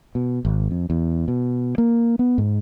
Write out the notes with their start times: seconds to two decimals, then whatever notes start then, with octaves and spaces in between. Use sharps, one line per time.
0.15 B2
0.45 G#1
0.71 F2
0.90 E2
1.28 B2
1.78 A#3
2.19 B3
2.38 G#2